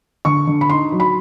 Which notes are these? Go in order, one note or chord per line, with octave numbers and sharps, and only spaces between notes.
D3 C#6
D3
B5
D#4 C6
F#3
B5